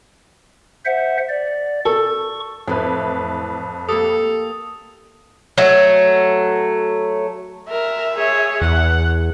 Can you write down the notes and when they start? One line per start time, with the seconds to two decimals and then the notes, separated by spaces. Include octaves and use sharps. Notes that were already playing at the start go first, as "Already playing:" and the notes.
0.86 C5 E5 F#5
1.29 D5
1.85 A4 C#6
2.68 F2 A2 E3 B4
3.89 A#3 G4 A4 D#6
5.58 F#3 A3
7.70 A#4 E5
8.15 G#4 C#5
8.62 E2 F#5